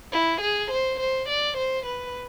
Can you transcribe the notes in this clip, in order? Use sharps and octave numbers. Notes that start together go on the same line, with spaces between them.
E4
G#4
C5
C5
D5
C5
B4